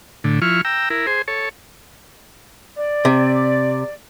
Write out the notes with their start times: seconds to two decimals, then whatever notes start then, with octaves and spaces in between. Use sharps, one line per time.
0.24 A2 D3
0.42 F3 E4 C#6 F6
0.65 G5 A#5 E6
0.90 E4 A#4
1.07 G#4 C5
1.28 A4 C#5
2.77 D5
3.05 C3